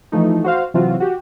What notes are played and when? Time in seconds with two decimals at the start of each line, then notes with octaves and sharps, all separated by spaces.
0.12 E3 F3 A3 D#4
0.44 F#4 C5 F5
0.74 C3 E3 F#3 C4 F4 F#4
1.00 F#4 G4